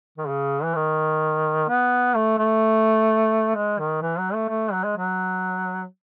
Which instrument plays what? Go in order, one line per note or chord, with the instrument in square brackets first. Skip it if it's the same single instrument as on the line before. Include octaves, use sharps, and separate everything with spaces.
[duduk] D#3
C#3
E3
D#3
B3
A3
A3
G#3
D#3
E3
F#3
A3
A3
F#3
G#3
F#3